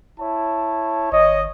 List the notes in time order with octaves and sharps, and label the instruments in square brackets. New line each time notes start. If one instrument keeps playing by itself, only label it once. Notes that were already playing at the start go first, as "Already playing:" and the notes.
[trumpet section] E4 C#5 A5
[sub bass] G#1 [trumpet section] C#5 D#5